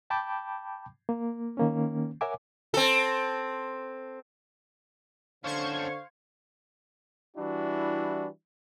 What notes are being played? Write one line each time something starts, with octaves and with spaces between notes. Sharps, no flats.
G5 A5 B5 D6 G6
A#3
D#3 A#3 C#4
A#4 C#5 E5 F#5 G#5 D6
C4 A4
D3 C#4 D4 C5 F5 C#6 G#6
E3 G3 D4 E4 F#4